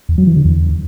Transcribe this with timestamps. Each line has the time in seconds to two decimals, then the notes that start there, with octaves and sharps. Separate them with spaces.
0.09 E2
0.18 F#3
0.27 E3
0.36 D3
0.45 E2